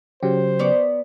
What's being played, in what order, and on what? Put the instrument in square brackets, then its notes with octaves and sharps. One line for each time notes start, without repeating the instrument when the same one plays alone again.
[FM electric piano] C#3 F#3 G4 [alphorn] C5
[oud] B3 C#5 D5